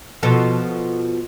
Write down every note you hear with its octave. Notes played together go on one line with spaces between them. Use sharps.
B2 F3 A4